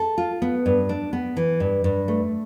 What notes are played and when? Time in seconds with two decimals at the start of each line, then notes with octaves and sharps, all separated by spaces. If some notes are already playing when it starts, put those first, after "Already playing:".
Already playing: A4
0.18 F4
0.42 B3
0.66 G2
0.89 D4
1.13 B3
1.37 E3
1.60 G2
1.84 G2
2.08 A3